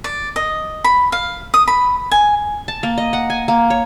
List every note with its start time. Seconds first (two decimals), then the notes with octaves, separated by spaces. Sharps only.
0.04 D5
0.36 D#5
0.84 B5
1.12 F5
1.54 D#6
1.67 B5
2.11 G#5
2.68 A5
2.83 A#3
2.98 D#5
3.13 F#5
3.30 G#5
3.48 A#3
3.70 C#5